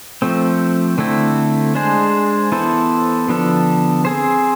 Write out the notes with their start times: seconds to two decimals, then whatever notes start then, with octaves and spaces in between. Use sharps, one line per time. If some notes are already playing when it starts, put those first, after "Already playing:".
0.22 F3 A3 C4
0.98 D3 A3 C4 E4
1.75 G#3 D4 G#4 C5
2.52 E3 B3 E4 A4 C5
3.28 D3 F3 B3 D4 A4
4.05 C4 G#4 C5